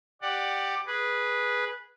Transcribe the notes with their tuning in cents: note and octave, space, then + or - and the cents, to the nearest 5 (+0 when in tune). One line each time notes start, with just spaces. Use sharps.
G4 +0 D5 +15 F#5 +0
G#4 +0 B4 -10